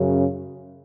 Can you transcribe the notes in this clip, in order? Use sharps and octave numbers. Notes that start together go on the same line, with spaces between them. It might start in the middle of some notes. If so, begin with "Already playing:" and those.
Already playing: F#2 C#3